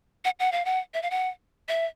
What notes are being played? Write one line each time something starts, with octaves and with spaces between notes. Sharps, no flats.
F#5
F#5
F5
F#5
E5
F5
F#5
E5